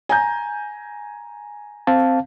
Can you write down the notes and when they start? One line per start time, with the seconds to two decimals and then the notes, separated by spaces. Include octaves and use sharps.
0.09 G#5 A#5 G6
1.87 C4 F5 A5